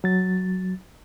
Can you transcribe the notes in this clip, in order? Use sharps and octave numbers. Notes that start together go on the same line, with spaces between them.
F#3 A6